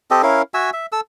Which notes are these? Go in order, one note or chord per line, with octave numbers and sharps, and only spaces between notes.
C4 G4 A4 D#5
C#4 E4 A#4 F5
F#4 E5 G#5 E6
E5
A4 E6